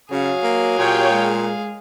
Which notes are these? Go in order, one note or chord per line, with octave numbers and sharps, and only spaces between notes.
C#3 F#3 G#4 F5
A#3
A#2 G4 C#5 G5
G#3